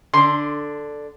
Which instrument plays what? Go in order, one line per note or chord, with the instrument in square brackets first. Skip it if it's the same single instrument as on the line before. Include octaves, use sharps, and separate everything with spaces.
[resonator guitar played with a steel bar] D3 D4 [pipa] C6